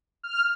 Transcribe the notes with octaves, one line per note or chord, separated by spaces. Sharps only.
F6